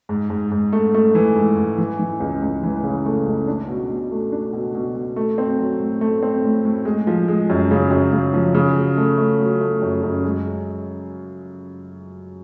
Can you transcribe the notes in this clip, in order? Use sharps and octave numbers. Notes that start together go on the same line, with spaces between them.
G#2
G#2
G#2
A3
A3
E3
G#2
G#2
E3
E3
C#2
C#2
E3
C#3
A3
C#2
D4
B2
B2
A3
D4
B2
B2
B2
A3
C4
F#3
A2
A3
C4
A2
A2
G#3
F3
G#3
F#2
C#3
F#2
C#3
F3
C#3
F#3
A3
A3
F#3
A3
F#2
F#2
G#3